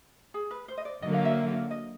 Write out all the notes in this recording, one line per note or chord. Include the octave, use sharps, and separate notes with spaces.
G#4
B4
C5
D#5
D5
D3 F#3 A#3 D#5
F5
E5
F5
D#5